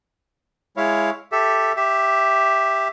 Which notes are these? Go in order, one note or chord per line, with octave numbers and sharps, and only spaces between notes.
G#3 E4 C#5 F5
G4 A4 E5
G4 E5